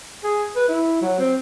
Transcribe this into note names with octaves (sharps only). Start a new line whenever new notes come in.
G#4
B4
E4
F#3
C4